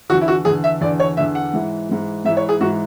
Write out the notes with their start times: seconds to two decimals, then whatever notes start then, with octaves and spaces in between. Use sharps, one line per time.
0.09 D3 F#4
0.13 E2
0.21 E4
0.28 F#4
0.45 E2 D3 G#4
0.64 E5
0.81 E2 D3 D5
1.00 C#5
1.17 E2 D3 E5
1.35 F#5
1.53 G#2 E3
1.89 G#2 E3
2.25 G#2 E5
2.29 E3
2.37 C#5
2.49 G#4
2.60 G#2 E3 F#4